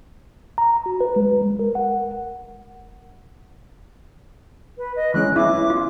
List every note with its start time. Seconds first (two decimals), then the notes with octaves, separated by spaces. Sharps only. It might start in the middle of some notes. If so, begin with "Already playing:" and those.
0.58 A#5
0.86 F#4
1.01 B4
1.16 G#3
1.42 G#3
1.59 A#4
1.75 F#5
4.78 B4
4.96 D#5
5.14 E3 G#3 C#4 F#6
5.36 B3 E4 D6
5.70 F4